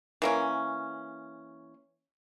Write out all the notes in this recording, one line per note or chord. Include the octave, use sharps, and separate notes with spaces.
E3 A#3 C#4